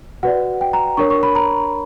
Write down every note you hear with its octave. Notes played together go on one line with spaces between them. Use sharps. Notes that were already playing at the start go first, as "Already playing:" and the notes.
F#4 B4 D5 F#5
G5
A#5
D4 A#4 C#5 C#6
C#6
B5
A#5